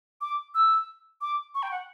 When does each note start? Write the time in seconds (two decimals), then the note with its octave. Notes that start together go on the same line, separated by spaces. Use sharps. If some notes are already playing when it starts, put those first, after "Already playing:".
0.21 D6
0.55 E6
1.21 D6
1.55 C#6
1.63 G5
1.71 F#5